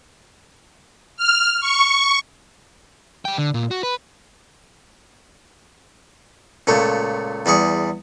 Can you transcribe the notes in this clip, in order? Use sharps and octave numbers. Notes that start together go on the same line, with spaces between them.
F6
C#6
G3 G5
D3
A#2
F#4
B4
C#2 A#2 A3 C#5
E2 G3 G#4 C#6